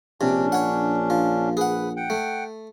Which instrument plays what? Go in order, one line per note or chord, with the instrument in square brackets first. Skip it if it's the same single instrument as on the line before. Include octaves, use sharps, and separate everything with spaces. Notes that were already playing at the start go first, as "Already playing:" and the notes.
[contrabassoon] A#1 [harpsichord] C3 [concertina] C#4 D4
[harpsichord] C#5 F#5
F3
[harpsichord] G#4 F#5 [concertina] B4
[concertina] F#5 G5
[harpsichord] A3